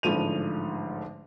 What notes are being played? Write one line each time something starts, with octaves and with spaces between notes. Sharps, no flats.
A1 G#2 D3 F3 D#7 F7